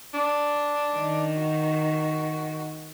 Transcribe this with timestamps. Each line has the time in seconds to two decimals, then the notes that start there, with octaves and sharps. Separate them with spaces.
0.14 D4
0.93 D#3
1.37 F#4